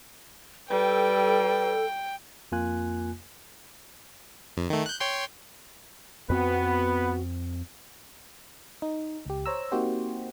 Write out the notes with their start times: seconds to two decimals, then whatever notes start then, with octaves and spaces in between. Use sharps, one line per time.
0.70 G3 A4 B4 G5
2.52 F2 A#3 F4 G#5 F#6
4.57 F2
4.70 D#3 A3
4.86 F#6 G6
5.00 C#5 G5 C6
6.30 F2 B3 C4 F#4 B4
8.82 D#4
9.26 C#2 G4
9.46 C5 C#5 A#5 E6
9.72 A#3 C4 D#4 F#4 G4 C5